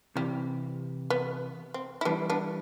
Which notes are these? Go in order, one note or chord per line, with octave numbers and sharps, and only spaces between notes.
C3 E3 G3
B3
C4
E4
E3 G3 B3 D4
B3 D4